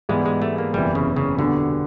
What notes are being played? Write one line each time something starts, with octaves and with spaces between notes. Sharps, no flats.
G#2 E3 G3 G#3 B3
G#3
A3
A#3
F#1 E2 C3 E3 G3
C#3
C#3
E2 B2 D3 G3 B3